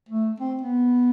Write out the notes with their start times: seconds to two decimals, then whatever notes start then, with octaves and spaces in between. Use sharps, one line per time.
0.09 A3
0.40 C4
0.61 B3